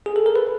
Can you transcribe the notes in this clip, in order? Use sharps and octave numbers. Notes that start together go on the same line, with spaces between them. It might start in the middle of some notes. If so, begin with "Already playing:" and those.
G#4
A4
A#4
B4